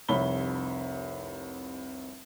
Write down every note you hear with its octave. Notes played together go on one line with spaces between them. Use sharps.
F1 C2 C#5 B5 G7